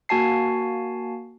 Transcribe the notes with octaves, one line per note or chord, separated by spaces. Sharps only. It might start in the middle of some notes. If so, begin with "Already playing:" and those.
A#3 F#4 G#5 A5 C7